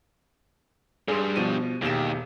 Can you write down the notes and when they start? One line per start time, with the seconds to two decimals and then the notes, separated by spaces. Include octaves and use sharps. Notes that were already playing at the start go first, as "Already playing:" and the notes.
1.08 G2 G3 G#4 C6
1.36 B2 F3 D#7
1.82 E1 D#2 G4 E7